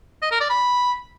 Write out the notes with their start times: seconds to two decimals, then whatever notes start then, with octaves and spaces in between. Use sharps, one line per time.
0.22 D#5
0.31 A#4
0.40 D5
0.49 B5